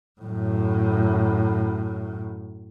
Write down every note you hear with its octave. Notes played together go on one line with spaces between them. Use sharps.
F#2 A2